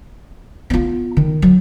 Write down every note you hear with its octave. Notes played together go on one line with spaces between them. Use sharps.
B3 F4
D#3
F#3